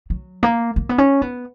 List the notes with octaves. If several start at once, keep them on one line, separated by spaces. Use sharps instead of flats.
F#3
A#3
A#3
B3
C#4
B3